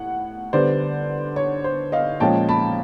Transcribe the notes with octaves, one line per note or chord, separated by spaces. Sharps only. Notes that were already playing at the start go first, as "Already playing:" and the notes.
Already playing: A2 F#5
D3 G3 B3 C5 D5
C#5
C5
D#5 F5
A#2 F3 G#3 C#4 G5 A5
A5 B5